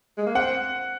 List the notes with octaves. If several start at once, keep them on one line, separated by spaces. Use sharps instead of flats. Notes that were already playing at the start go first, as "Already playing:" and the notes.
G#3
A#3
C4 F#5